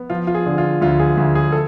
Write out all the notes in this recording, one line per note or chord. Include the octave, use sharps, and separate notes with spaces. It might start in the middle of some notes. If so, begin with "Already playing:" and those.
Already playing: B3
F3 F4
F4
G#4
D3
F4
D2 F4
G#4
D2
G#4
A4